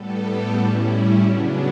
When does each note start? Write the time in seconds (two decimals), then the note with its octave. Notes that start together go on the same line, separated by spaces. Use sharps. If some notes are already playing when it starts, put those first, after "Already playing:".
Already playing: A2 G3 B3 A4
0.24 G4
0.56 A2 G3 C#4 E4
0.89 E4
1.21 C#3 F#3 B3 D4